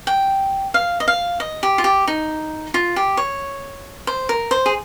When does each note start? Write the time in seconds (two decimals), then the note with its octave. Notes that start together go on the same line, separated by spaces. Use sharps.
0.07 G5
0.74 F5
1.00 D#5
1.08 F5
1.40 D#5
1.63 G4
1.78 F4
1.84 G4
2.08 D#4
2.74 F4
2.96 G4
3.17 C#5
4.07 C5
4.29 A#4
4.51 C5
4.66 G#4